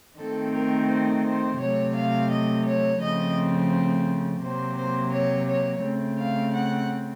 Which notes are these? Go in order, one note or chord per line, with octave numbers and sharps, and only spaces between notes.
D#3 A3 C4 A4
A#4
C5
C5
C3 F#3 A3 C#5
F5
D#5
C#5
C#3 F3 A3 C4 D#5
C3 F#3 A#3 C5
C5
C#5
C#5
C#3 A3 C4
F5
F#5